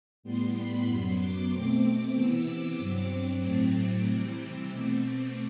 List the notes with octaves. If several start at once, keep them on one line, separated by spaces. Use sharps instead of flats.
A2 G3 B3 C6
B5
F#2 F#3 B3 C6
D6
B2 A3 C4
C3 E3 B3 E6
D6
G2 F#3 C4
A2 F#3 A3 C4
D6
C3 E3 G3 C4 D6
E6
B2 A3 C4 D6
D6